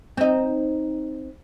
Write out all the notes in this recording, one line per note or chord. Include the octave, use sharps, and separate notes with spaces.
C4 D#4